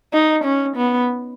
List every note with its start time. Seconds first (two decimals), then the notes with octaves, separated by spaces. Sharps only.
0.13 D#4
0.44 C#4
0.76 B3